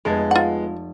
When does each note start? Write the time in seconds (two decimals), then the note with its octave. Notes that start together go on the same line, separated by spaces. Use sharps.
0.05 F1 G#3 B3 A5 G#6
0.31 F4 F#5